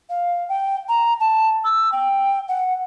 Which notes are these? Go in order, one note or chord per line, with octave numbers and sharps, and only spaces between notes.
F5
G5
A#5
A5
E6
G5
F#5